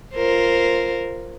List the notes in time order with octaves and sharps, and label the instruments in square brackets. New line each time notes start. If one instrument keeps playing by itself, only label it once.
[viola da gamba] F4 A#4 C5